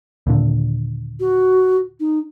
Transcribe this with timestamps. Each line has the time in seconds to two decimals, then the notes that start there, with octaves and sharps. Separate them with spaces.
0.27 D#2 A#2 D3
1.20 F#4
2.00 D#4